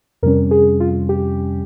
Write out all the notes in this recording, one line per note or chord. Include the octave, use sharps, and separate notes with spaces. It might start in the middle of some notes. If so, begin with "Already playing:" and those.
F2 C3 G3 C#4 A#4
G#4
F4
G4